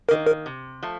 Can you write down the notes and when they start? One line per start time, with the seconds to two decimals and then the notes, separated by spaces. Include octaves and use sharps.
0.08 D#3 A#3 A#4
0.27 A#4
0.46 C3
0.83 F3 A3